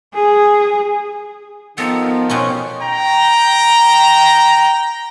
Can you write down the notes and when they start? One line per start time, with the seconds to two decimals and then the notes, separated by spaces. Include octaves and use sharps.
0.14 G#4
1.78 D#3 F3 B3 A4
2.30 B2 C4 C#4
2.81 G5 A#5